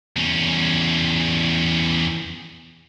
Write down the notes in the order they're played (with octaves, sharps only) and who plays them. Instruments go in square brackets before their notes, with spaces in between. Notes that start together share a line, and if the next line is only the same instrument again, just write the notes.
[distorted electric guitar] E2 C#4